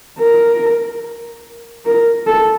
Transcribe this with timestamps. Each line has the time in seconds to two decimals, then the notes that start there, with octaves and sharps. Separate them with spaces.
0.19 A#4
1.85 A#4
2.27 A4